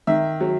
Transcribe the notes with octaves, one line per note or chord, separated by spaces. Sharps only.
D#3 E5
F#3